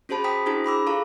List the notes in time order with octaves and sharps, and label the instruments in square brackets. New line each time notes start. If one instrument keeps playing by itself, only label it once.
[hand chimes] C#4 F#4 G#4 C5 A5 B5
G5 A#5 D#6 B6
D4 E4 F#4 G#4 C5 A#5
G#4 B5 D6 E6
F4 A4 F5 A#5 C#6